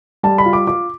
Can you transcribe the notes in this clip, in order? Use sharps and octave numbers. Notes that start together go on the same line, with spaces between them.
G3 A5
B5
F4
D6
F4 D6